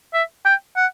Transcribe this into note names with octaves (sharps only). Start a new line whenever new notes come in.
E5
G5
F#5